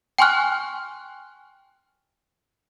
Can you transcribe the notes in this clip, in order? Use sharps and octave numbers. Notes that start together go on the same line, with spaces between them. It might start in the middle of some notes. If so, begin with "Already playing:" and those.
G5 G#5 C6 C#6 F6 F#6